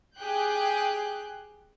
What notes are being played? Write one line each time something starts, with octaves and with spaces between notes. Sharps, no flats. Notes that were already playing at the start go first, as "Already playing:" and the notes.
G4 G#4 G5 F#6 G6